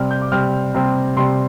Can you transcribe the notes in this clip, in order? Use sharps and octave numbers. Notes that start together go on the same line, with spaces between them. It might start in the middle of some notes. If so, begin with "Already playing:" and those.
Already playing: C3 G3 C4 F6
G6
D6
C3 G3 C4 F6
C3 G3 C4
C3 G3 C4 C6